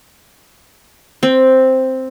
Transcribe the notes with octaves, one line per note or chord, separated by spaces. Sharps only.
C4